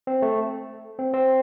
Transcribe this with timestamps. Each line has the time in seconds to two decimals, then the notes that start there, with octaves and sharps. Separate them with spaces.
0.07 C4
0.22 A3
0.99 C4
1.14 C4